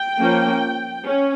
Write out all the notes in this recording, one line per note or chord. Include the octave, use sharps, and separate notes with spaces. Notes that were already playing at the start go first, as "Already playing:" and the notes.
Already playing: G5
F3 A#3 C#4
C#4